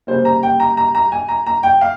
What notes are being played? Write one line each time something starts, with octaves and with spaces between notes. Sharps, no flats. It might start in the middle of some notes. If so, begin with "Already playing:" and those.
C#3 G3 A#3 C5
A#5
G5
A#5
A#5
A#5
G#5
A#5
A#5
G5
F5